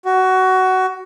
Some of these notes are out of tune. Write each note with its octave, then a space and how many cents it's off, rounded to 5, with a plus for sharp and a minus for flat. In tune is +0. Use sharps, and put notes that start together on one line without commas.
F#4 +15